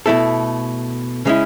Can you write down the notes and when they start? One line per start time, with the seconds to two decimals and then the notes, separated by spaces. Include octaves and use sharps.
0.06 B2 A3 E4 A4
1.25 C#3 G#3 C#4 E4